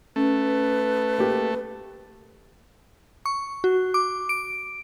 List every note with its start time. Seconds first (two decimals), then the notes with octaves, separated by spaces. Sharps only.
0.16 A3 C#4 B4
1.18 A#3 G4
3.26 C#6
3.64 F#4
3.94 D6
4.29 D7